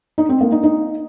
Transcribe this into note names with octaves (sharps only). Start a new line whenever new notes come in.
D#4
C4
A#3
D#4
D#4